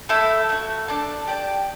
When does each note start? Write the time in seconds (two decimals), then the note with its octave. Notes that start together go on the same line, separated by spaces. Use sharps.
0.09 A3 E4 A4 E5
0.49 A3 D4 F#4
0.88 D4 A4 D5 A5
1.27 G4 D5 A5